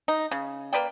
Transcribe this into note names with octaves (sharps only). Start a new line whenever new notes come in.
D#4
C#3
A#3 B4 D5 G5